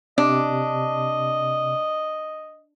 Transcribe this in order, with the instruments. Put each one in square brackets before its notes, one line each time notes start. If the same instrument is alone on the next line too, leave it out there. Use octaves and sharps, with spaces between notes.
[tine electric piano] C3 [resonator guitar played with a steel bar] D4 [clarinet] D#5